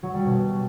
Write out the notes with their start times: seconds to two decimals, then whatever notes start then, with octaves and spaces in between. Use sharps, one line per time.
0.03 F#3
0.14 G3
0.25 B2